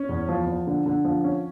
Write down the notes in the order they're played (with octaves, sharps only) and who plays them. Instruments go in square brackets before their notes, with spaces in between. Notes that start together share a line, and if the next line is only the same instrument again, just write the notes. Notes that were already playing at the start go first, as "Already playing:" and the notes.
Already playing: [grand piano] C#4
E2
F3
F3
D3
D3
F3
C#4